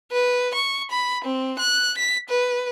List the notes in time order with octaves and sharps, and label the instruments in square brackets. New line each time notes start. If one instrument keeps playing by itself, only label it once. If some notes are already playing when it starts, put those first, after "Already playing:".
[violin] B4
C#6
B5
C4
F#6
B6
B4